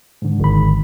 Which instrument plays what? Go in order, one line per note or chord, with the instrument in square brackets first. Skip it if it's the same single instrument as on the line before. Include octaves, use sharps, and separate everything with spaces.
[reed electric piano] G#2 D3
[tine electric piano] G#1 B5